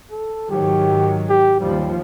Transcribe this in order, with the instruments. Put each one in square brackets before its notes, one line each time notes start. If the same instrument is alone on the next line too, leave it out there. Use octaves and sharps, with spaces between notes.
[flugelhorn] A4
[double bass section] G#2 D#3 F#3 [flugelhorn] G4
[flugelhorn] G4
[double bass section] D#2 F3 [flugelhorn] G3